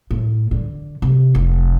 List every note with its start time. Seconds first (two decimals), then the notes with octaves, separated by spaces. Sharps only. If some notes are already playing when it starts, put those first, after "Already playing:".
0.11 A2
0.51 D3
1.02 C3
1.35 F1